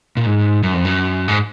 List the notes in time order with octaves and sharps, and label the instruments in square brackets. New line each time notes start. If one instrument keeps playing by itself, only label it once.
[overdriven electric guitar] A#2
G#2
F#2
F2
F#2
G#2